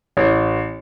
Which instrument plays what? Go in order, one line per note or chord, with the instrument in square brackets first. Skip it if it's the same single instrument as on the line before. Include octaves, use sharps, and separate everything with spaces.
[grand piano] A1